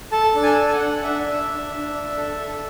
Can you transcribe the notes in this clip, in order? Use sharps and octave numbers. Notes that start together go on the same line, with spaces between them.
A4 A5
D4
G#5
A4
F#5
D4
D4 E5
D4
D4
D4
D4
A4
A4